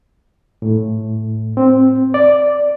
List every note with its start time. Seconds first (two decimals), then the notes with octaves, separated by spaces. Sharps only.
0.62 A2
1.57 C4
2.14 D5